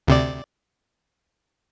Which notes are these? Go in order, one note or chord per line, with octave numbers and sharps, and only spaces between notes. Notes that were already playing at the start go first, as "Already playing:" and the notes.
D2 C3 D5